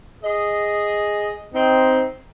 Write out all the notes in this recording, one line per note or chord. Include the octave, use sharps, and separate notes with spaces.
G#4 D#5
C4 D#4